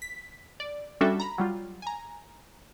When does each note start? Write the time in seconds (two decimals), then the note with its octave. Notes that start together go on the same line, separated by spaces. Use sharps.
0.02 B6
0.60 D5
1.01 G3 C#4 D4 F#4 A4 E5
1.20 A#5 B5
1.38 F#3 G3 F4
1.82 G#5 A#5